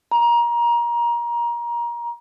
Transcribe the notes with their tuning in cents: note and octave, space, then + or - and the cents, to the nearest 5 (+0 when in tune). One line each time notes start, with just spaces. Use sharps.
A#5 +25